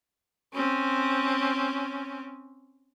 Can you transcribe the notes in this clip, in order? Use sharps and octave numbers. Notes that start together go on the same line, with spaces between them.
C4 C#4